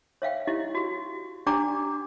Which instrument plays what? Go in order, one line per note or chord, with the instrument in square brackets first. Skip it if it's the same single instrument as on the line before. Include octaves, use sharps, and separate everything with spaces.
[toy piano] C#5 E5 F5 G5
E4 G4 D#5
F#4 G4
D4 G4 D5 G5 A#5 D6